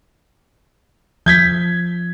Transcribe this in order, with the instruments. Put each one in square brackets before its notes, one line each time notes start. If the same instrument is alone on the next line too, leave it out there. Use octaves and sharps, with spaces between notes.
[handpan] F3 [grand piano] G6 G#6 B6